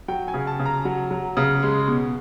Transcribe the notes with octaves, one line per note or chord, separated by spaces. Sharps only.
F#3 G5
G#5
C#3
A5
C#3
A#5
F#3
F#3
C#3
G#3
B2